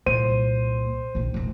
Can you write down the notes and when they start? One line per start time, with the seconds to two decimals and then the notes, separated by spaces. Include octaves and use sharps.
0.06 C2 A#2 C5 D#7
1.15 A#1 D#3
1.34 F1 C4